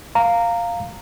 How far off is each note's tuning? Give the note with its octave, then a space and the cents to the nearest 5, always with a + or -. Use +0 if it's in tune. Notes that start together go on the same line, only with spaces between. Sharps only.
F5 +0 A#5 -15